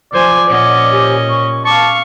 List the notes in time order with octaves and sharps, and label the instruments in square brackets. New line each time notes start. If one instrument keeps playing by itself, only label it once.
[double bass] F3 [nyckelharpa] C5 G#5 [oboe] D5
[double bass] A#2 [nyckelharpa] C#4 D#5 [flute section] F#5
[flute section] G4 C5 G#5
C#6
[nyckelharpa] F5 C#6 [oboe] A5 [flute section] D6